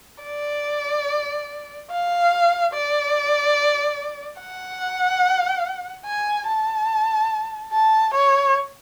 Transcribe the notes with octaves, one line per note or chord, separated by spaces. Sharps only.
D5
F5
D5
F#5
G#5
A5
A5
C#5